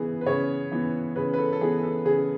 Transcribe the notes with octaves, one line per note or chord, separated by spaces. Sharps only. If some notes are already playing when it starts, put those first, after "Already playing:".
Already playing: C#3 E3 B3 G#4
B4
C#3 C#5
E3 B3
C#3 B4
B4
A4
A4
E3 B3 G#4
A4
C#3 G#4